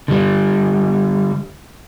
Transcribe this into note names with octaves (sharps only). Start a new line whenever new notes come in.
D3 G3